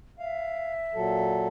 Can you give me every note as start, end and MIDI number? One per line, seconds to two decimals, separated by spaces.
0.19 1.48 76
0.19 0.73 77
0.95 1.48 46
0.95 1.48 54
0.95 1.48 69